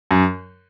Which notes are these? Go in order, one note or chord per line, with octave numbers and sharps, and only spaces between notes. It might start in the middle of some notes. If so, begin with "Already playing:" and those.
F#2